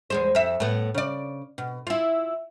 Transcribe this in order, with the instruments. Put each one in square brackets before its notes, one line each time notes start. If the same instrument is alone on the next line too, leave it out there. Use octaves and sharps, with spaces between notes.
[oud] E2 G#3 C5
F2 E5
A2 B3
C#3 D5
B2
E4 F4